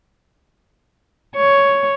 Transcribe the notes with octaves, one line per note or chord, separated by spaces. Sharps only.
C#5